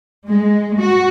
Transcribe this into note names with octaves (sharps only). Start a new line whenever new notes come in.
G#3
F#4